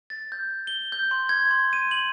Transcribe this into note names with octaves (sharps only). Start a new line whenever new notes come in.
A6
G6
G7
G6
C6
G#6
C6
D#7
F#7